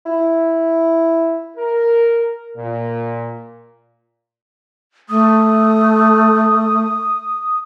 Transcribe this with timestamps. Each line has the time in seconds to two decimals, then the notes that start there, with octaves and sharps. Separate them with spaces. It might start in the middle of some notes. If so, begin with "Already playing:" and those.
0.06 E4
1.57 A#4
2.55 A#2
5.09 A3 D#6